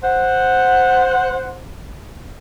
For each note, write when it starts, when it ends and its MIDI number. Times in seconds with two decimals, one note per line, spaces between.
0.03 1.58 72
0.03 1.58 78